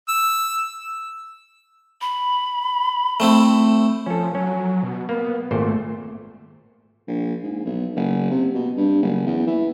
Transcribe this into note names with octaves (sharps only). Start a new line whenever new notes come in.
E6
B5
A3 C4 E4
F3 C#4 A4
F#3 C#4
B2
A#3 B3
G#1 A#2 A3 C5
A#1
G#2
B1
F#1
C3
B2
G2
F#1
E2
E3